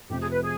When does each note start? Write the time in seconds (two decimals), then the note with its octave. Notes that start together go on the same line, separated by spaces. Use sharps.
0.09 F1 F2 C3 G4
0.20 G#4
0.31 B4
0.42 G#4